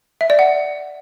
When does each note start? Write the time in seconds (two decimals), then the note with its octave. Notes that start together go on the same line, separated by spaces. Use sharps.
0.21 E5
0.30 D5
0.39 F#5